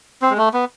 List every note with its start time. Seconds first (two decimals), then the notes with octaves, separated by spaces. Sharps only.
0.22 C4
0.30 G#3
0.38 A3
0.54 B3